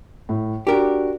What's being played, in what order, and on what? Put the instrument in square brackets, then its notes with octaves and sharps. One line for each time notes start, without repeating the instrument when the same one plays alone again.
[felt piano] A2
[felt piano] D4 F#4 [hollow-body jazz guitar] G4 A#4